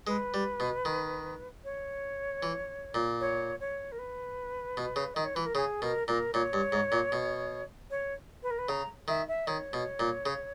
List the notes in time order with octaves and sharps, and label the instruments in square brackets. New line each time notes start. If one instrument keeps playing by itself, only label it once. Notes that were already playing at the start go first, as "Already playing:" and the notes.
[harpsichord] G#3 [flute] B4
[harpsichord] G3
B2
D#3
[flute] C#5
[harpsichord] E3
A#2
[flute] C#5
C#5
A#4
B4
[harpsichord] B2
C#3
[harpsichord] D#3 [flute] D#5
[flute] C#5
[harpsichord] E3 [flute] B4
[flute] A#4
[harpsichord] C#3 [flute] G#4
[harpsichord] B2 [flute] A#4
[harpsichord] A#2 [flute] A#4
[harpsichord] A#2 [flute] C#5
[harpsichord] G2
G#2
A#2
B2
[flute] C#5
B4
A#4
B4
[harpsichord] C#3 [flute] A#5
[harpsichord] D#3 [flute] E5
[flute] E5
[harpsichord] D#3 [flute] C#5
[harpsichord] B2
A#2
C#3